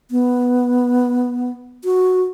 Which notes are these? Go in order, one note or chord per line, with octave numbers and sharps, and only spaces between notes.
B3
F#4